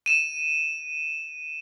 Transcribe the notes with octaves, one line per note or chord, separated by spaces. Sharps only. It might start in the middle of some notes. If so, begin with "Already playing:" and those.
D#7 E7